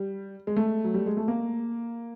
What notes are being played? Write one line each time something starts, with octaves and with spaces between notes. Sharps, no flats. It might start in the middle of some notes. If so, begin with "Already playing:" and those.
Already playing: G3
G#3
A3
F#3
G3
G#3
A3
A#3